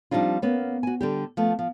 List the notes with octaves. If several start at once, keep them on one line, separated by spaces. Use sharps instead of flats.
F3 G3 C4 D4 D#4 F4
A#3 B3 C#4
F#4 G#5
D3 G3 G4
F3 A3 B3
F3